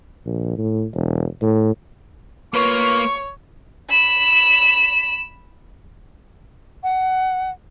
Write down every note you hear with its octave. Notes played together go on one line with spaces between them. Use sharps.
A#1
A2
E1
A2
A#3 F4 B4 C#5 C#6
B5 E7
F#5